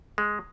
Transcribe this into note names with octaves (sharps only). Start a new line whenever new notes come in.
G#3